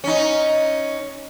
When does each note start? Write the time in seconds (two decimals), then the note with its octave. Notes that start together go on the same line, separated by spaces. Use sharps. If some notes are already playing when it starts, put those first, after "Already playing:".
0.04 C#4 D#4